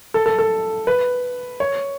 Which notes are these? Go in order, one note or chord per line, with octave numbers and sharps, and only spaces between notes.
A4
A4
A4
B4
C#5